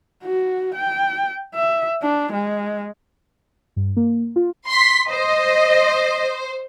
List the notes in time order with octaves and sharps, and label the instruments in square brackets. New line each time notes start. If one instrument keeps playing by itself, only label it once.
[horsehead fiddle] F#4
G5
E5
D4
G#3
[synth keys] G2
A#3
F4
[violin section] C6 B6
[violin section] C5 [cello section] D#5